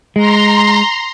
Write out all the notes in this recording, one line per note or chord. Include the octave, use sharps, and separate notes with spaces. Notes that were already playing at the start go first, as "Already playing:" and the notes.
G#3 A#5 C6